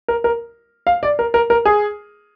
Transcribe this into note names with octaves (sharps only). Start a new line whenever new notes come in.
A#4
A#4
F5
D5
A#4
A#4
A#4
G#4